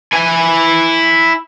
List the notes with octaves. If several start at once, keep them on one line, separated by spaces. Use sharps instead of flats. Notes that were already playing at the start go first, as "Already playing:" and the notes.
E4 G#5